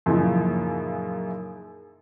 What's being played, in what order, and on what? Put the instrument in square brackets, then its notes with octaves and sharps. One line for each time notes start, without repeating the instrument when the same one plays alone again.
[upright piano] F#2 A#2 C#3 E3 F3 D#4